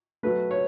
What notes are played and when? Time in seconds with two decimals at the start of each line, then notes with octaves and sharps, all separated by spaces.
0.23 B2 F#3 A3 B4
0.51 C#5